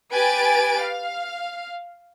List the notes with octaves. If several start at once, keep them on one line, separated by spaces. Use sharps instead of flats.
G4 B4 G#5 A6 D7
F5